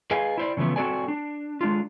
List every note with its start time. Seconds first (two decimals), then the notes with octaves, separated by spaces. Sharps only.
0.11 G#4 B4 D#5 F5 G#5
0.38 E4 C5 D5
0.57 C#3 E3 F3 A3 B3
0.76 C4 F#4 A4 D5 G#5
1.08 D4
1.61 G#3 D4 F4